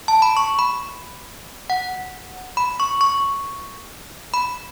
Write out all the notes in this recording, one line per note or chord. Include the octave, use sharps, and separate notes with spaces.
A5
B5
C#6
B5
F#5
B5
C#6
C#6
B5